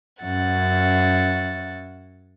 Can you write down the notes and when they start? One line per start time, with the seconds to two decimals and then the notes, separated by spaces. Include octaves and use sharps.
0.23 F#2 C#4 E5 F#5 A6